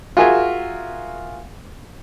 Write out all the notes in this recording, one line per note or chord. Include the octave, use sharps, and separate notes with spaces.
F4 F#4 G#4 A#4 E5 G#5